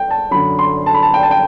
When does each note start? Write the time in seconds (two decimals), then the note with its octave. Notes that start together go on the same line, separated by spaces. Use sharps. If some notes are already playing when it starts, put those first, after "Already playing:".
Already playing: G5
0.10 A5
0.31 F#2 D3 B5
0.59 C6
0.86 A5
0.94 B5
1.02 A5
1.14 G5
1.23 A5
1.31 G5